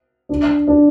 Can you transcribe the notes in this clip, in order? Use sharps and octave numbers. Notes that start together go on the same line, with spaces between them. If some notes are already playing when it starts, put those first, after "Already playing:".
D4
D4